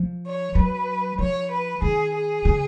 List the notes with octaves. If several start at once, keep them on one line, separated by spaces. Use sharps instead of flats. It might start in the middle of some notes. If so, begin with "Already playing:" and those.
Already playing: F3
C#5
F#3 B4
F3 C#5
B4
D#3 G#4
G#4
C#3